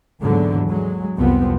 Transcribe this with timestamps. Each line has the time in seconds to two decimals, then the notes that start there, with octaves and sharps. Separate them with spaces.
0.20 D#2 G#2 D3 E3 F#3 B3
0.68 F#3 G#3
1.15 C2 F2 F3 B3 C4